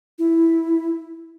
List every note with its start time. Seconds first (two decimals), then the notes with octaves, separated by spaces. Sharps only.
0.19 E4